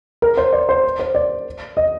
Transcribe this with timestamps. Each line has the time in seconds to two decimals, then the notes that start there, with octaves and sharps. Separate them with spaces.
0.22 A#4
0.37 C5
0.53 D5
0.69 C5
0.99 C5
1.15 D5
1.77 D#5